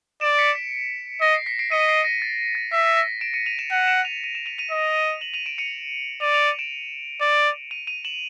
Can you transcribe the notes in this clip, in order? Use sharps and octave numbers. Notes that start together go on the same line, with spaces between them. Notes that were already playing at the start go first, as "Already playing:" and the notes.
D5 D7 E7
B6 C#7
B6
D#5 A#6
C7
B6 C#7
C7 D7
D#5 C#7 D#7
C7 D7
A#6
A6
A6
E5 B6
A#6
D7 E7
C#7 D#7
D#7 F7
D7 E7
F#5
D7 E7
D#7 F7
D#7
E7
D#7 F7
D#7 F7
D#5
E7 F#7
D#7 F7
D7 E7
C#7 D#7
D5 D#7 F7
D#7 F7
D#7 F7
D7 E7
D5
D#7 F7
D#7 F7
E7 F#7